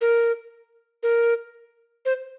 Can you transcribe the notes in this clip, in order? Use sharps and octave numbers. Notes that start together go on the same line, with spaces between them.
A#4
A#4
C5